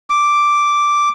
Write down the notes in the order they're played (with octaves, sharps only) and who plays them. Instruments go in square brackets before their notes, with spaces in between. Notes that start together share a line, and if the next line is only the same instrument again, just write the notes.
[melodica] D6